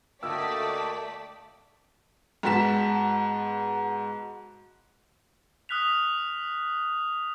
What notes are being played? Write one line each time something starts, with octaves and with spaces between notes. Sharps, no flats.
D2 A3 A#3 D5 D#5 G5 E6 B6
G#2 B3 F#4 A5 B6 E7
D#6 F6 F#6 B6 F7